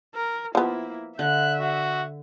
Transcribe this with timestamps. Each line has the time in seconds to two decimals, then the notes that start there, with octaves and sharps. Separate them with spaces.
0.15 A#4
0.55 F3 A#3 B3 E4
1.19 D3 E5 F#6
1.60 F#4